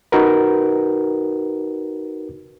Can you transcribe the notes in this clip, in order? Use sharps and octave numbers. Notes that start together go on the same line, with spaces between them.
D#4 F#4 A#4 B4